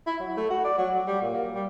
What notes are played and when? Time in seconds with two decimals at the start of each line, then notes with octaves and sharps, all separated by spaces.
0.07 E4
0.20 F#3
0.37 A3
0.50 F#4
0.64 D5
0.78 F#3
0.94 F#3
1.07 G3
1.22 A#2
1.34 A#3
1.55 G3